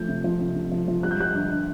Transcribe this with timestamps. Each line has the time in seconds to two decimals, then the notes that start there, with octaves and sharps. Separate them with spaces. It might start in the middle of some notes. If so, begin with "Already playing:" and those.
Already playing: F3 A3 G6
0.08 C3
0.24 F3
0.40 C3
0.55 C3
0.71 F3
0.88 F3
1.03 G3 F#6
1.11 G6
1.19 G3 F#6
1.35 D3
1.50 D3